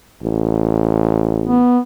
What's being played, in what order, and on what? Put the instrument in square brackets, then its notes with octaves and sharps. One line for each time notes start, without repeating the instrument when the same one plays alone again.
[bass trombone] A1
[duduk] B3